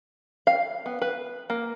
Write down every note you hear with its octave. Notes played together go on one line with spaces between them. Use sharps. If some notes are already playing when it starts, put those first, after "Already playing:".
F5
B3
B4
A#3